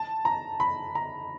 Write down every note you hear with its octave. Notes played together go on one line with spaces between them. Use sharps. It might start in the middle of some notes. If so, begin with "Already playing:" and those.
Already playing: A5
A#5
B5
A#5